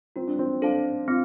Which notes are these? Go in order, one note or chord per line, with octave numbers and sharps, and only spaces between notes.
C4 F4
D4
C4
D4 A4 C5 F5 A5
C4 F4